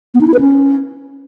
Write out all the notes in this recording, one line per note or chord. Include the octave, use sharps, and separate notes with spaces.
B3
D#4
E4
B4
C#4